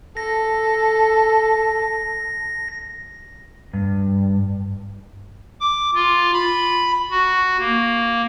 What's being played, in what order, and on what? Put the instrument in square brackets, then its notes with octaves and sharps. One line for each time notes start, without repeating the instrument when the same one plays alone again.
[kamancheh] A4 [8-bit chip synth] A#6
[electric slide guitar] G2
[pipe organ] D6
F4
B5
F#4
A#3